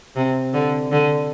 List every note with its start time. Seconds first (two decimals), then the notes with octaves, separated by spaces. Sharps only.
0.16 C3
0.54 D3
0.92 D3